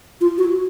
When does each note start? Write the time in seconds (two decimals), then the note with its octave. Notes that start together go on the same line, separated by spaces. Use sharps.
0.21 F4
0.38 F#4